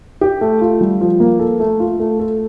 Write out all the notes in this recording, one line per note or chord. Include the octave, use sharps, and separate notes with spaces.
G4
A3
F4
G3
F3
A#3
A4
A3
F4
A3
A4